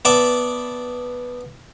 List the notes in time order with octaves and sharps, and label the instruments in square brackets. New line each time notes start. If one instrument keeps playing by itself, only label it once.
[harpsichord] B3 D5 E5 A5